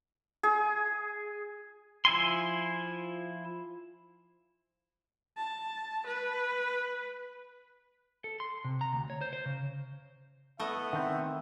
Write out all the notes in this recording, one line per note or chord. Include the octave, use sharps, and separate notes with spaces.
G#4
F3 E4 G#5 C6
A5
B4
A4
C6
C3
A#5
D2
C#5
C5
C5
C#3
A3 B3 E4 D#5 E5 F#5
D#3 C4